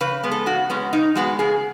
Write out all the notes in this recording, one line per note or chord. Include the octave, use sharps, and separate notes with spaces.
C#3 B4
G#3 B3
A4
C#3 F#4
G#3 B3 C#4
C#3 D#4
G#3 B3 F#4
C#3 G#4